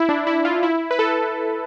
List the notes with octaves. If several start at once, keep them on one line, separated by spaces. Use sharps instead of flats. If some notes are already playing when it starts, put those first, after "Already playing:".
Already playing: E4
D4
E4
F4
E4
B4
A4